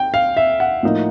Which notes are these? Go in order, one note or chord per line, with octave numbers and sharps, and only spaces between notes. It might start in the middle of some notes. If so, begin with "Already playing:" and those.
Already playing: G5
F5
E5
F#5
A2 F3 A#3 D#4